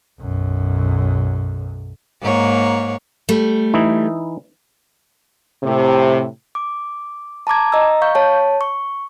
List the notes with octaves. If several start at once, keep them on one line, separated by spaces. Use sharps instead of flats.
B1 F#2
G#2 A#3 C#5
G3 A3
E3 D#4 E4
A2 C3
D6
A5 A#5 D6 G#6
D#5 A#5 E6
F5 C#6 G6
C#5 A5
C#6